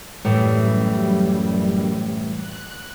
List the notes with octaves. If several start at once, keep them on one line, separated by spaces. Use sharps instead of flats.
F#2 A2 E3 G3
F#6